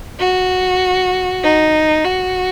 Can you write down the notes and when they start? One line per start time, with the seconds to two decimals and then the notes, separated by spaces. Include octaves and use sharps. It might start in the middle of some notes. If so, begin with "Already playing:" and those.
0.19 F#4
1.43 D#4
2.05 F#4